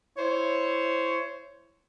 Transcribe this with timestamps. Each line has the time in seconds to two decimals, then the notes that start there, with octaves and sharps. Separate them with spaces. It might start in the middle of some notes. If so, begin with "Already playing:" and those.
0.18 E4 C5 C#5